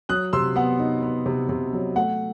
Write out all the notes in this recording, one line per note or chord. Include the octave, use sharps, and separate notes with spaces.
F#3 D#6 F#6
C3 C6 E6
B3 F#5
D#4
B3
C3
C3
F#3
A3 F#5